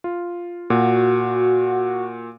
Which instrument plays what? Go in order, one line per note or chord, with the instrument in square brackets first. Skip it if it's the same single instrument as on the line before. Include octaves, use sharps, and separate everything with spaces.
[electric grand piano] F4
[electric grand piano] A#2 [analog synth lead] F#4